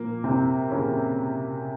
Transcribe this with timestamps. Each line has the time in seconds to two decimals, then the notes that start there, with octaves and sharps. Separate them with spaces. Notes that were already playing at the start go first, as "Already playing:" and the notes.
Already playing: A#2 F3 A#3
0.24 C3 C4
0.70 A#2 C#3 F3 C#4